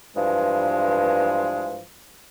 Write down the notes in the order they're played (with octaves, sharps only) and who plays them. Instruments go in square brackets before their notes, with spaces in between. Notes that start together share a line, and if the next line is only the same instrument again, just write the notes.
[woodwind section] G2 E3 F3 G#3